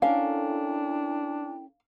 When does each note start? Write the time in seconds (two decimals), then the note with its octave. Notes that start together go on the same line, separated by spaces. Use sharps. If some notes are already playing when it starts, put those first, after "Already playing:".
0.02 C#4 D4 E4 A4 A#4 F5 G5